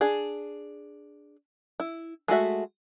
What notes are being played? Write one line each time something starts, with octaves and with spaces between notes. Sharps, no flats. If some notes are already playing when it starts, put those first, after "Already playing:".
D4 G#4
E4
G#3 A3 F#4 E5